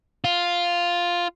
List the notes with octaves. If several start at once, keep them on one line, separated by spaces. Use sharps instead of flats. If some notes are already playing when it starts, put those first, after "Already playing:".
F4